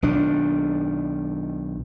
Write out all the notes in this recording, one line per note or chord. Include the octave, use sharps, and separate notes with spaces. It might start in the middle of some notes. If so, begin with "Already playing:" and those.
B1 D#3 D4